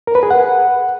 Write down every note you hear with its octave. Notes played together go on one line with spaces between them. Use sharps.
A#4
B4
G#4
F#5